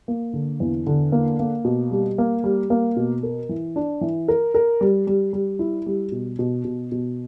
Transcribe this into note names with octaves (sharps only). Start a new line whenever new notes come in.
A#3
D3
E2
D3
A#3
A#3
B2
G3
A#3
G3
A#3
B2
A#4
E3
D4
E3
A#4
A#4
G3
G3
G3
E4
G3
B2
B2
B2
B2